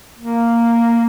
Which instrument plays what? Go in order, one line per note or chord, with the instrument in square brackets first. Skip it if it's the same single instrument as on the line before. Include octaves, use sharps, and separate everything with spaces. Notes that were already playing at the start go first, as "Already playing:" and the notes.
[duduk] A#3